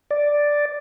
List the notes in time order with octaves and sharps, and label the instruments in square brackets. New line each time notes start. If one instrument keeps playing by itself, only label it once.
[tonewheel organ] D5